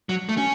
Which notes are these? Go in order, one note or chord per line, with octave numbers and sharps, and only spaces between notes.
F#3
A3
C#4